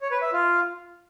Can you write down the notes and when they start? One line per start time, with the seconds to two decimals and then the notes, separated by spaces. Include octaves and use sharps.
0.01 C#5
0.11 B4
0.22 E5
0.33 F4